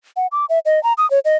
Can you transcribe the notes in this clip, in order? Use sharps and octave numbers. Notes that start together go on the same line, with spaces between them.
F#5
D6
E5
D#5
A#5
D#6
C#5
D#5